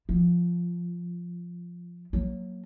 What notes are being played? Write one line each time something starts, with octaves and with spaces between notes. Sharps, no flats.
F3
F#3 A#3